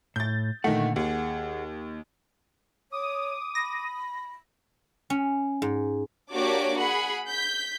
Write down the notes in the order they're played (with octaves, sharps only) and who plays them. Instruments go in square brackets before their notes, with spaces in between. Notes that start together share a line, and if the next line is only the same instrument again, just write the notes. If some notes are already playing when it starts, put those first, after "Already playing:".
[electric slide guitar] A2 [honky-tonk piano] G6 A6
[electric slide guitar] A#2 D3 F#5 [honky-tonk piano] D#3 A3
[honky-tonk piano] D#2 [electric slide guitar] G#4 F#5
[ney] C#5 [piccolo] D6 [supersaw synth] D#6
[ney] B5 [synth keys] A#6
[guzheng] C#4
G#2
[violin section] A#3 D4 F#4 G4 C#5 D6
G#4 F#5 B5
G6 B6